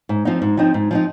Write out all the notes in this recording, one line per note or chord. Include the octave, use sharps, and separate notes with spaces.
G#2
F3 C4 D#4
G#2
F3 C4 D#4
G#2
F3 C4 D#4